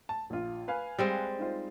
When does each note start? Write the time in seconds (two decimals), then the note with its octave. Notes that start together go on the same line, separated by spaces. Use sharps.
0.09 A5
0.30 A#1 F4
0.68 B4 F5 G#5
0.99 G3 G#3 C4
1.39 D#4 F4 C5